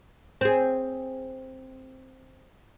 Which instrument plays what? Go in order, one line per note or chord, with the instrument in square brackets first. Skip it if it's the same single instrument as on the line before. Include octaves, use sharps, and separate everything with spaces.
[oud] C4 G#4